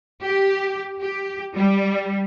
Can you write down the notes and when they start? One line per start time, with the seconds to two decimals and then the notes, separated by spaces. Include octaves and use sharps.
0.23 G4
1.01 G4
1.56 G3